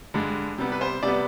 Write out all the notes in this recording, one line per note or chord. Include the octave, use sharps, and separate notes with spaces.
G2 D3 G#3
C3 G3 B3
B4
C5
C3 G3 B3 D5